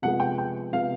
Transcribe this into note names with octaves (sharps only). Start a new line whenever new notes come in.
C3 F3 G#3 B3 F#5
G5
G5
C3 F3 G#3 B3 F5